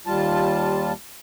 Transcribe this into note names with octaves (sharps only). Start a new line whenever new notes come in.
D#2 G3 F4 A5